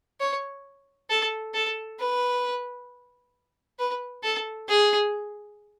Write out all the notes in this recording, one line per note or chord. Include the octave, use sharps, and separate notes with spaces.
C#5
A4
A4
B4
B4
A4
G#4